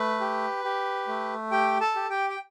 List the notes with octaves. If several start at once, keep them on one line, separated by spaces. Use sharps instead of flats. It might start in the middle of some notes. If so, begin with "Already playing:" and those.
Already playing: A3 B4
G4
G4
A3
G4 G5
A4 A5
G4
G4 G5
G5